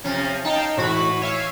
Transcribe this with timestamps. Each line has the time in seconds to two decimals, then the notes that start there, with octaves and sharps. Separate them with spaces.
0.04 C3 F3 C#4
0.45 D#4 F5 G5 A5
0.77 A2 E3 F#4 B5
1.22 C#5 E5 F5